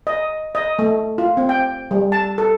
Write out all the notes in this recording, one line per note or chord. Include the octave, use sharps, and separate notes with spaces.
D#5
D#5
A3
F4
C4
G5
G3
A5
A4